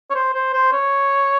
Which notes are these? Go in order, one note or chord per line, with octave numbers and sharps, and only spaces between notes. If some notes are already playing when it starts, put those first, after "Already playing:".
C#5
C5
C5
C5
C#5